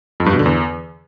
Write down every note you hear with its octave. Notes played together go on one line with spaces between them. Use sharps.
F2
G2
B2
D3
E2